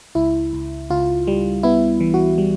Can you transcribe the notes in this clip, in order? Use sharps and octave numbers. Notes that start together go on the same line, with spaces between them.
C#2 E4
C#2
C#2 F4
G3
B3 E4
E3
F#4
G3